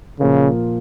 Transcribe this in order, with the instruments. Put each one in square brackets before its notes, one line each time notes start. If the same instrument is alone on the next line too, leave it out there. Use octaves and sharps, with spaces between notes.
[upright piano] A#2 F3 A#3 F4 A#4 [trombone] C#3